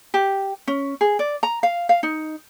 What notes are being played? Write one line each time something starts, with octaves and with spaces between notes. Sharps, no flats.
G4
C#4
G#4
D5
A#5
F5
F5
D#4